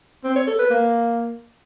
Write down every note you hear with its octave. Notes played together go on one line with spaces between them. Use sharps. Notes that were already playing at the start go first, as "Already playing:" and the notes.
C4
C#5
A4
B4
A#3